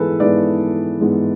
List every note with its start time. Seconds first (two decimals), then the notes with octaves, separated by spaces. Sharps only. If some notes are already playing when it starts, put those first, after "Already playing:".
Already playing: G#2 E3 G#3 B3 G#4 A4 B4
0.20 G#2 E3 G#3 B3 B4 D5
1.01 G#2 E3 G#3 B3